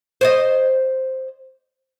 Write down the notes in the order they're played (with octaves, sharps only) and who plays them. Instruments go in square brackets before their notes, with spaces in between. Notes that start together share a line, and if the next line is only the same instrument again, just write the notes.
[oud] C5 C#5 D#5